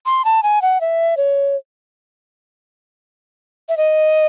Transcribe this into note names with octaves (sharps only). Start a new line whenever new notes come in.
C6
A5
G#5
F#5
E5
C#5
E5
D#5